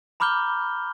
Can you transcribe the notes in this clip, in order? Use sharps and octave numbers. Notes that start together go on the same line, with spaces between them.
A#5 B5 D6 F6 G6 G7